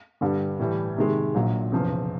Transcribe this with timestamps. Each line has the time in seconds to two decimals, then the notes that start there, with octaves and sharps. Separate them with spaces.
0.21 G2 D3 G3
0.59 A2 E3 G3
0.97 C3 D#3 G#3
1.34 A#1 A#2 F#3
1.72 F1 E2 C#3 F3